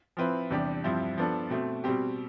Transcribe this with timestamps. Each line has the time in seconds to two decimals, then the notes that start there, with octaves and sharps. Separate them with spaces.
0.17 F3 C4 E4 B4
0.50 E2 C3 G3 D4 G4
0.84 G2 F3 C4 E4
1.18 F3 B3 D4 A4
1.50 B2 A3 C4
1.84 B2 G3 C4 G4